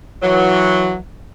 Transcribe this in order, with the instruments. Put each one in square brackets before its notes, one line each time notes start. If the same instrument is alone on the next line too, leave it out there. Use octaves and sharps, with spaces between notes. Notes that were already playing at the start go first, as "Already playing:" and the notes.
[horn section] E3 F#3